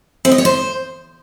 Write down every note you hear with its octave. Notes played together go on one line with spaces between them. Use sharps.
C4
D#5
C#5
C5